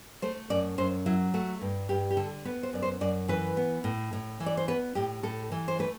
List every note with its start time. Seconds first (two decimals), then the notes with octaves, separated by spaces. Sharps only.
0.22 A3 C5
0.50 F#2 D5
0.78 F#2 C5
1.06 F#3 E4
1.34 A3 F#4
1.61 G2
1.89 G2 G4
2.10 G4
2.17 D3 A4
2.45 B3 B4
2.63 C5
2.73 F#2 D5
2.82 C5
3.01 F#2 D5
3.28 E3 B4
3.57 B3
3.84 A2
4.13 A2
4.40 E3
4.46 D5
4.57 C5
4.68 B3 B4
4.95 A2 G4
5.23 A2 A4
5.52 E3
5.68 C5
5.79 A3 B4